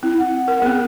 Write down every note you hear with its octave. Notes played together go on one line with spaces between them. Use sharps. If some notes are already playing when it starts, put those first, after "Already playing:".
C4 E4
F#5
A#4
B3 C4 G#4